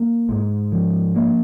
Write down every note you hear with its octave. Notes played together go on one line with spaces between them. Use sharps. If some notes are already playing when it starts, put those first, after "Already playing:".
Already playing: A#3
G#2
F3
A#3